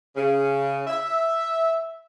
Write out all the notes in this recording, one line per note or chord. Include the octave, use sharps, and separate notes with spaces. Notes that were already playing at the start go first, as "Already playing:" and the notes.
C#3
E5